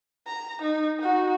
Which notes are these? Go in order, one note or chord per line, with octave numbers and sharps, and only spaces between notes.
A#5
D#4
D#4 F#4